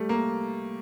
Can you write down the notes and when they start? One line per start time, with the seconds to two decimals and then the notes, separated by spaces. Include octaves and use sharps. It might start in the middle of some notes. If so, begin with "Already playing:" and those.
Already playing: G3 A3
0.09 A#3